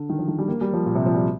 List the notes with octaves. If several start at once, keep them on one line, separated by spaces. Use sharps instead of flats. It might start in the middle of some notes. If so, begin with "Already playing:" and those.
Already playing: D3
D#3
F3
D#3
G3
A#3
G3
F3
A#2
C3
F3
G3